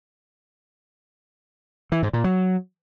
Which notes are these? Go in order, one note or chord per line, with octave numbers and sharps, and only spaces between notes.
E3
G#2
A#2
F#3